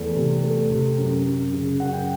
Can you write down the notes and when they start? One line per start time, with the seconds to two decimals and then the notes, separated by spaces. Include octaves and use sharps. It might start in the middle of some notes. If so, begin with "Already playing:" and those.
Already playing: E2 A3
0.15 C3
0.43 A3
0.71 C3
0.98 F#2
1.26 F#2
1.53 C#3
1.80 F#2 F#5
1.93 G5